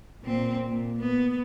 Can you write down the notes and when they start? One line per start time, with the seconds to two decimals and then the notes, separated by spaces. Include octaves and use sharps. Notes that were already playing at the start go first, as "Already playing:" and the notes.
0.23 A#2 C4
0.67 A#2
1.00 B3